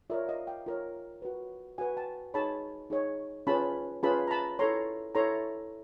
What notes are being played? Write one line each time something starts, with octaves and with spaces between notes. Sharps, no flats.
F4 A#4 C#5 D5 E5
D#5 F5
F5 G5
F4 A#4 C#5
F#4 B4
F#4 B4 F#5 G#5
G5 A5
D#4 G#4 C#5 A5 B5
D#4 G#4 C#5
C#4 F4 G#4 B4 A5 B5
C#4 F4 G#4 B4 A5 B5
A#5
A5 B5
E4 A4 C#5 A#5 C6
E4 A4 C#5 A#5 C6